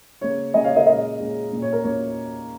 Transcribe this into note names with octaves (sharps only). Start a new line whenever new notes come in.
C#3 A#3 C#4 C#5
C#3 A#3 C#4 D#5 G#5
C#5 F5
A#4 D#5
A#2 G#3 C#4 A#4 D#5
A#2 G#3 C#4
A#2 A#3 C#4
C#5
A#4
A#2 A#3 C#4 C#5